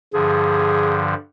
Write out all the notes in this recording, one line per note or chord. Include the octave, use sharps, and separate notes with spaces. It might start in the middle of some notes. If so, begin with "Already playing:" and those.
G2 D3 F3 G#4